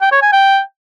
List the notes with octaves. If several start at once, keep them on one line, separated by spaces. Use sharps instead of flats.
G5
C#5
G#5
G5